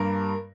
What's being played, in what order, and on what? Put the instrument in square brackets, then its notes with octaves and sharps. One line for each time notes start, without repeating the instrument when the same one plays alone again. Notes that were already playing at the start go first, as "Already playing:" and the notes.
Already playing: [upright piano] G2 G3 A#3 A#4